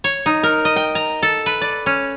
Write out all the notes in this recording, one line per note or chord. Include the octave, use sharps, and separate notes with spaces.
C#5
D#4
A#4
D#5
G5
A#5
A4
B4
D5
C#4